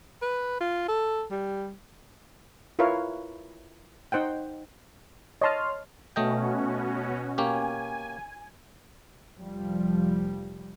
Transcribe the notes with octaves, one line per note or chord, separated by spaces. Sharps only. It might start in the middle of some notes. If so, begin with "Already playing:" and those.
B4
F4
A4
G3
E4 F4 A#4 B4 C#5 F5
D#4 C5 F#5 G5
C#5 D#5 A5 C6 F6
B2 A3 C#4 F#4 D#5 G5
A#3 C#4 G4 G#5
F1 F3 G3